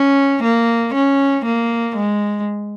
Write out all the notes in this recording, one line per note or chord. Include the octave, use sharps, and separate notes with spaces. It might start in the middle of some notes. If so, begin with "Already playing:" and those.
Already playing: C#4
A#3
C#4
A#3
G#3